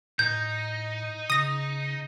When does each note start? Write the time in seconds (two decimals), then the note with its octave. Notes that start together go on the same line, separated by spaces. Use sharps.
0.19 A2 D#4 G6
1.30 C#3 D#6 A#6